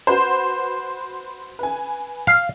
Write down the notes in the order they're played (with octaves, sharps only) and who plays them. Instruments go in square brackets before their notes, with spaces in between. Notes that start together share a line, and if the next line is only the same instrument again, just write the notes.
[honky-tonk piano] F#4 B4 C5
B4 G#5
[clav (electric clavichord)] F5